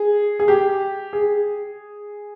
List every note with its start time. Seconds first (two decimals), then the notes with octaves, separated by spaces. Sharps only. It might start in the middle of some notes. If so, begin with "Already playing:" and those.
Already playing: G#4
0.39 G#4
0.48 G4
1.13 G#4